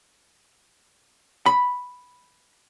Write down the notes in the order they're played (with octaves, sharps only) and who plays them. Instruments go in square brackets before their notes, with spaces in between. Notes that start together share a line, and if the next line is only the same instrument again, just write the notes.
[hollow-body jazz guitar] B5